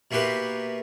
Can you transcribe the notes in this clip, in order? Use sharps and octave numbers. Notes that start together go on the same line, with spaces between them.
B2 A#3 E4 G4 B4 C6